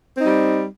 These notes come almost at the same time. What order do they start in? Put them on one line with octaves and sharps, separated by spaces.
C4 D#4 G3